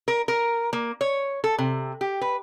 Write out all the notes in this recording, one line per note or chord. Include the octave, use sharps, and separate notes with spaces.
A#4
A#4
A#3
C#5
A4
C3
G4
B4